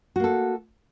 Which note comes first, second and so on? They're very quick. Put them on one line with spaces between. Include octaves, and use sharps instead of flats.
F#4 A#3 A4